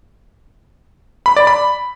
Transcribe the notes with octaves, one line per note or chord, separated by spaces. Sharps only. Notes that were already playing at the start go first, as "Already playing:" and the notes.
B5
D5
B5